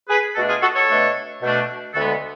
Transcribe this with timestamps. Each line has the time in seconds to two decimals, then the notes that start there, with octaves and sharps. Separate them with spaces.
0.09 G#4 B4
0.35 B2 A3 D4 F#4 A4
0.49 F4 G#4
0.62 F#4 A4
0.75 A4 C#5
0.89 B2 A3 D4
1.42 B2 A3 D4
1.94 D2 D3 G#3 B3 F#4 A4